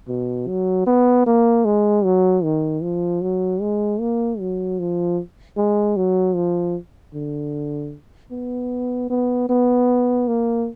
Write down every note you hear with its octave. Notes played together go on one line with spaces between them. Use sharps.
B2
F#3
B3
A#3
G#3
F#3
D#3
F3
F#3
G#3
A#3
F#3
F3
G#3
F#3
F3
D3
B3
B3
B3
A#3